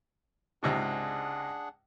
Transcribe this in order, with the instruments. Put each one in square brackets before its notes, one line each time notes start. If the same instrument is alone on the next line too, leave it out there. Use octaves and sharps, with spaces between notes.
[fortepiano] C#2 G#2 C3 [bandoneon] D4 G#4 F#5